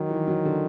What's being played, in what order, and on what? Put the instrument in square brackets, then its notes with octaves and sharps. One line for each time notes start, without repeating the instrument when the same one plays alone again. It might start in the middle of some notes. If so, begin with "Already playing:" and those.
Already playing: [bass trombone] D#3 [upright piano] F#3
[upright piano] E3
F#3
D3